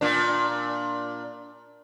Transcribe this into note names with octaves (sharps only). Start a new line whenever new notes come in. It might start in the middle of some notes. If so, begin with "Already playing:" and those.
A#2 D4